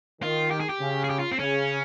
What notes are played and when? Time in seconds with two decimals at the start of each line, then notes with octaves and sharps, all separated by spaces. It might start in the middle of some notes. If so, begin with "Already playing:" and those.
0.22 D#3 F4
0.51 G4
0.60 G#4
0.69 G4
0.80 C#3
1.04 G#4
1.10 G4
1.19 F4
1.32 C4
1.39 C#3 C#4